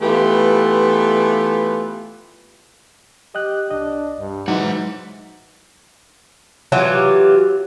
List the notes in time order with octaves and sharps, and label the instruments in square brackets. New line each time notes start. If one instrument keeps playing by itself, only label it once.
[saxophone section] E3 A3 B3 F4 G4 B4
[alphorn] G4 [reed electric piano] D#5 G5 F#6
[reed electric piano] C2 D#5 [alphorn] D4
[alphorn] G2
[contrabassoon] G#2 [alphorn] E3 [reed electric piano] F#3 [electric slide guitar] D#4 F#5
[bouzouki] E3 F#3 F4 G4